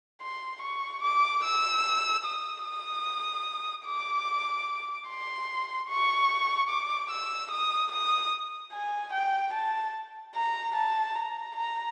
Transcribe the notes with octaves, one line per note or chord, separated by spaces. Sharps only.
C6
C#6
D6
E6
D#6
D#6
D6
C6
C#6
D6
E6
D#6
D#6
G#5
G5
A5
A#5
A5
A#5
A#5